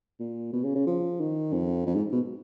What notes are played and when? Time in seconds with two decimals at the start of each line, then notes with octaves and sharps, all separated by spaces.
0.20 A#2
0.53 B2
0.64 C#3
0.75 C#3
0.87 F3
1.20 D#3
1.53 F2
1.87 F2
1.95 G#2
2.12 B2